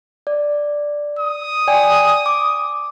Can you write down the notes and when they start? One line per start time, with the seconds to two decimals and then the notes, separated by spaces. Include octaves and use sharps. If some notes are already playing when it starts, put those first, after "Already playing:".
0.27 D5
1.19 D#6
1.68 D5 G5 G#5
2.26 D6